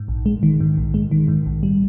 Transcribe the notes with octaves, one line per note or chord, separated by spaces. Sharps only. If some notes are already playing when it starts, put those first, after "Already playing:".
Already playing: G#2
A#1
G#3
D#3
G#2
A#1
G#3
D#3
G#2
A#1
G3